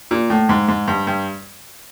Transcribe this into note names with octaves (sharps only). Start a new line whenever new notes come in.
A#2
A2
G#2
G#2
G2
G2